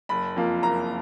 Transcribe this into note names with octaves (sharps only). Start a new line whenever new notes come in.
F#1 B5
F2 F3 A#3
F#1 A#5